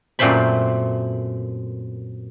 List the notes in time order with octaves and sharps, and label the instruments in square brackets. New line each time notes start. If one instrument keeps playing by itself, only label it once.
[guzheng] F#2 A#2 A3 C4 C5 B5